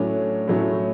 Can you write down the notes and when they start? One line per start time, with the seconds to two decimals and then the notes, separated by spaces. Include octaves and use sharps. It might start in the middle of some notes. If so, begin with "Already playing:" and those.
Already playing: A2 F#3 A3 C#4 D4 D5
0.48 A2 F#3 A3 C#4